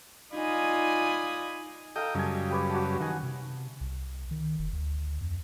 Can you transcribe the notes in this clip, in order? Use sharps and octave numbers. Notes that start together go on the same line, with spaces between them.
D#4 F4 D5 G#5 B5 D#6
A4 D#5 F5 G5 A#5
F#2 C#3 G3 D#5 G#5
G4 B4 C#5
F#4 A5
D#3 F#5 G#5
C3
C2
D#3
F1
D2
F2